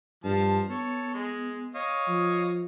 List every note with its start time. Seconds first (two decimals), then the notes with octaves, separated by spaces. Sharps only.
0.24 G2 F3 A5
0.69 B3 A4 C#5
1.14 G#3
1.75 C#5 D#5 F5
2.08 F3